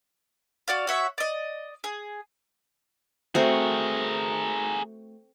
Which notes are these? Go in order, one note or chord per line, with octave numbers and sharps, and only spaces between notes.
F#4 D5 F5
F#4 C#5 E5 F#5
D5 D#5
G#4
A3 C4 F#4 G#4 A#4